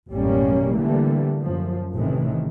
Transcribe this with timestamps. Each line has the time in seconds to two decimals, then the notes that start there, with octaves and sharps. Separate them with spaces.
0.11 A1 F#2 B2 G3 A#3 C#4
0.76 D3 E3 G3 A3 A#3
1.42 F#2 F3
1.95 A1 A2 C3 D#3 E3